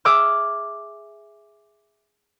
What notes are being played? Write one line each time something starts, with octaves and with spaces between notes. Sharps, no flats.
G#4 E5 D6 E6 F6